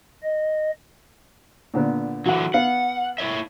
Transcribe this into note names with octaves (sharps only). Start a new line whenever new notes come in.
D#5
A#2 D3 B3
D3 E3 F#3 F#4 F#5
B3 F5 F#5
E4 C#5 E5